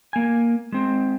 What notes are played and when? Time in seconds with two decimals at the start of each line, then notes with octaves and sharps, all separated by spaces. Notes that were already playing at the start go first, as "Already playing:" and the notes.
0.13 A#3 G#5
0.72 G#3 C4